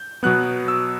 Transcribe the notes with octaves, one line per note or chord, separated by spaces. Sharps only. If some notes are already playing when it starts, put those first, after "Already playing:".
Already playing: G6
B2 F#3 B3 F#6
E6